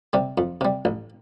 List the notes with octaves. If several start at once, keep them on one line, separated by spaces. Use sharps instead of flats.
C3 G3
F2
C3 G3
A1